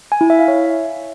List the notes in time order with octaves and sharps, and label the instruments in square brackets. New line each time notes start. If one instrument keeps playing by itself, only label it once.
[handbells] G#5
E4
E5
F5
C#5